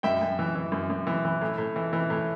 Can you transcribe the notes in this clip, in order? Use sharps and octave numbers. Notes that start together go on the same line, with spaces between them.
F#2 E5 G5
F#2
E3
E3
F#2
F#2
E3
E3
A2
A2
E3
E3
A2